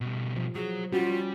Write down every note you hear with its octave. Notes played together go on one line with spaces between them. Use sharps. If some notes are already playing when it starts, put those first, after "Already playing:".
B2 G3
F3
F#3 F#4 G#4
G3 C#4 F4 F#4